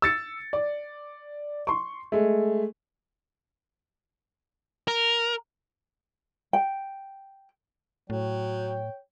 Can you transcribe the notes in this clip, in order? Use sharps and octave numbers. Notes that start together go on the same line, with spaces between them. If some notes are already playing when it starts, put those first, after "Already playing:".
E6 A6 C#7
D5
C6 C#6
G#3 A3
A#4
G5
A2 F#3 C#5 G5